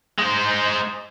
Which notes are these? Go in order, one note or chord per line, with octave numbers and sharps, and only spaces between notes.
G#3 C5